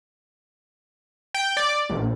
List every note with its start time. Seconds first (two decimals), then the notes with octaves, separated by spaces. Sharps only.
1.34 G5
1.57 D5
1.89 A#1